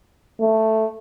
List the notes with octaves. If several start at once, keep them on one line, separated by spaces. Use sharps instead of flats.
A3